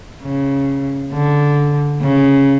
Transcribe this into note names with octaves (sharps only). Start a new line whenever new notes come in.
C#3
D3
C#3